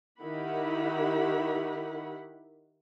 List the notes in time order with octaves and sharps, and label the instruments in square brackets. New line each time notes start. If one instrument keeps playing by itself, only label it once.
[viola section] D#3 E4 G4 A#4 F#5 B5